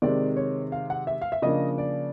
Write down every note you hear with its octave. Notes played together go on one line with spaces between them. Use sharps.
C3 D#3 G#3 C4 D5
C#5
F5
F#5
E5
F5
E5
C#3 F3 A#3 D4 D#5
D5